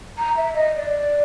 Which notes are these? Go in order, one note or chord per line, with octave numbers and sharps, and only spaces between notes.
A#5
E5
D#5
D5